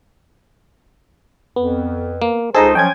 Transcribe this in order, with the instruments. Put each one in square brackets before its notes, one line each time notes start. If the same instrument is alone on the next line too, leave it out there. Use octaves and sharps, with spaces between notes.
[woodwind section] F2 [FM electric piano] B3
[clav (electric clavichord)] A#3
[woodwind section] C#2 D#4 C5 [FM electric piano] G#4 [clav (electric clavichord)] A4 D#5 A#5
[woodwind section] F3 F#3 C#4 [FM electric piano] G5 G#5 G#6